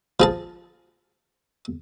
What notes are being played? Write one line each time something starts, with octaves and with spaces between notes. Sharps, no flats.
F3 G#4 A5